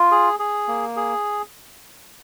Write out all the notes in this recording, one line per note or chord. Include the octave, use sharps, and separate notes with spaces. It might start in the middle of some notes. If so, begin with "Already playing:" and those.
Already playing: F4
G#4
G#4
A#3
G#4